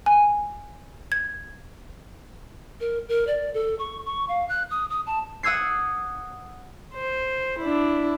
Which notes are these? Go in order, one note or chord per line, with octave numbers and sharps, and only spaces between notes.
G#5
G#6
A#4
A#4
D5
A4
C#6
C#6
F5
F#6
D#6
D#6
A5
F#5 D#6 E6 G#6 C7
C5
D4 E4